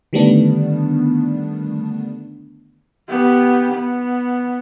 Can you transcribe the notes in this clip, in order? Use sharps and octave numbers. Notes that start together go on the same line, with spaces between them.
D3 D#3 G3 A3 B3 D4
B3 G4
B3